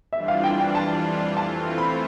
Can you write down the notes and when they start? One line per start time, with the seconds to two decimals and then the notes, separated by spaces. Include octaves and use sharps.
0.13 F2 E3 G3 D4 F4 E5
0.28 F5
0.44 G5
0.59 G5
0.75 A5
1.37 E3 A3 C4 F4 A5
1.78 B5